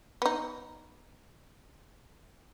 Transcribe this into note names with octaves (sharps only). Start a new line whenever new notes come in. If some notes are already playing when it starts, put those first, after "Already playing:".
B3 D#4